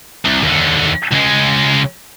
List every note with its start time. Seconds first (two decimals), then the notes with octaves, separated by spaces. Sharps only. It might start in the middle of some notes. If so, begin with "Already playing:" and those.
0.25 C2
0.43 D#2 D3
1.11 C#2 G#3